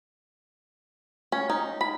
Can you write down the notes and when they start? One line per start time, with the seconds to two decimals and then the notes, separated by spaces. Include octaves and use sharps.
1.32 C#4
1.50 D#4
1.81 B5